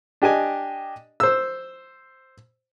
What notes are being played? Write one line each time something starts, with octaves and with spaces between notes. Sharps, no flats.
D4 G4 D#5 G#5
C5 E6